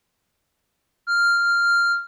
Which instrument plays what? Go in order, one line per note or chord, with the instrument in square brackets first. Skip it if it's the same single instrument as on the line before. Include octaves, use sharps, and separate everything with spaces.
[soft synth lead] F6